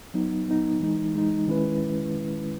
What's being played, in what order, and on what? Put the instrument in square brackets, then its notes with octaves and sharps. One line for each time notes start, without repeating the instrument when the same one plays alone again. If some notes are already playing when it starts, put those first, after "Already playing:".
[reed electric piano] F#3 B3 D#4
F#3 B3 D#4
E3 G#3 D#4
E3 G#3 D#4
D#3 G#3 C#4 E4 B4